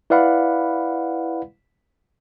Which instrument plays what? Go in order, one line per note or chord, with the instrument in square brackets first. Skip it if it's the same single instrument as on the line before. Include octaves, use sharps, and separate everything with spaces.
[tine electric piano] E4 B4 D5 F5 F#5 B5